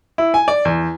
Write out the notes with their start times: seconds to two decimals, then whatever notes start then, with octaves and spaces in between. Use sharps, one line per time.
0.18 E4
0.34 G#5
0.48 D5
0.65 E2